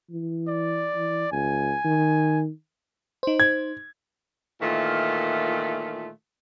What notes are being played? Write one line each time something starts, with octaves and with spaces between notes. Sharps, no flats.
E3
D5
E3
C#2 G#5
D#3
D#4 C5
G#6
A#2 D#3 E3 A3 F4